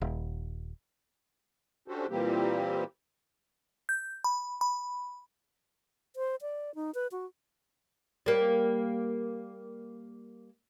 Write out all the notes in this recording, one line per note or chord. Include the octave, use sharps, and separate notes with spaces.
D#1
C#4 D4 F#4 G4 A4 C5
A#2 E3 G3 A#3 C4 G4
G6
B5
B5
C5
D5
D#4
B4
F#4
G3 A#3